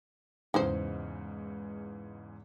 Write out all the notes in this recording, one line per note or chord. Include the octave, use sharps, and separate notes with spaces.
E2 G#2 C#3 D#4 E4 C5